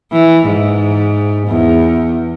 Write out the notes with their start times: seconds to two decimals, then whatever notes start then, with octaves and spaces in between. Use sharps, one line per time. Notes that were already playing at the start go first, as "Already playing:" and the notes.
0.12 E3
0.46 G#2
1.47 E2